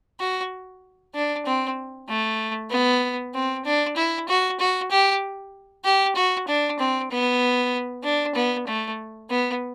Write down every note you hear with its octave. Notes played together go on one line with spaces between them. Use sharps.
F#4
D4
C4
A3
B3
C4
D4
E4
F#4
F#4
G4
G4
F#4
D4
C4
B3
D4
B3
A3
B3